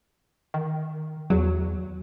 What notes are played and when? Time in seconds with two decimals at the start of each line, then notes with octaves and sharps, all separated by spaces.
0.54 D#3
1.30 E2 F#3